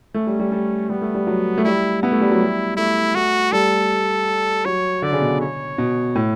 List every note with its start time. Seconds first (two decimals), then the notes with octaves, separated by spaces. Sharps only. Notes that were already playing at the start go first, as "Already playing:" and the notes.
0.14 A3 C#4
0.27 G3
0.40 G3
0.52 G3
0.90 G3 B3
1.02 A3
1.15 G3
1.27 F#3
1.58 A3
1.64 G3 E4
2.03 B3 E4
2.12 A3
2.21 G3
2.31 F#3
2.40 G3
2.77 A3 E4
3.15 A3 F#4
3.52 G3 A4
4.65 F#3 C#5
5.02 D3 D5
5.13 C#3
5.21 B2
5.40 C#5
5.78 B2
6.15 A2